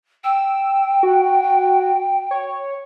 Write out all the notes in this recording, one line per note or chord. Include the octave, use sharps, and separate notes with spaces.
G5 E6
F#4
C#5